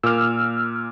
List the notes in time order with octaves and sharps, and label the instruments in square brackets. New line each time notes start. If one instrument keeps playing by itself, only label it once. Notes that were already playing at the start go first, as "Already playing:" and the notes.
[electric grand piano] A#2 D6 [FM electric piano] E6 F6